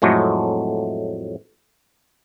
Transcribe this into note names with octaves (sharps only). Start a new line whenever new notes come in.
F2 A2 F#3 G#3 A3